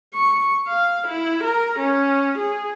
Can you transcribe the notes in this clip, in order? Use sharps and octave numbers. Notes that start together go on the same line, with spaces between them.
C#6
F5
E4
A#4
C#4
G#4